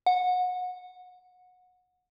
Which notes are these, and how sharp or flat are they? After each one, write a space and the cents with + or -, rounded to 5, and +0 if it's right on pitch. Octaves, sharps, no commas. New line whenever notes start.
F#5 -25